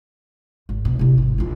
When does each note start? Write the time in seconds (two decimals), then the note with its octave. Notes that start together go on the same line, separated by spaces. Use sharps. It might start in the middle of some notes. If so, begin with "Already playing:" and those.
0.69 G#1
0.85 B2
0.99 C3 E4
1.18 G#1
1.38 A#1 F4